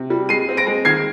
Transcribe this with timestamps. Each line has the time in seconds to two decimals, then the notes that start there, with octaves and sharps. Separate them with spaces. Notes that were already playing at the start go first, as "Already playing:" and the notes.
Already playing: C3
0.10 G3
0.29 G#3 C7 D#7
0.49 C4
0.57 A#6 D7
0.67 G#3
0.85 D#3 G#6 C7